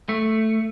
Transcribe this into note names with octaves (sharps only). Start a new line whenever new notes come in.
A3